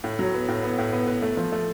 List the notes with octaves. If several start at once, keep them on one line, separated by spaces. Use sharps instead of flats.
A2
F#3
B3
A2
B3
A2
B3
B3
A3
F3
A3